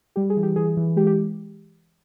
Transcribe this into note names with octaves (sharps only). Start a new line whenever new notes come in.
G3 G4
G#4
E3
G4
E3 G#4
E3
G#3 G4
G4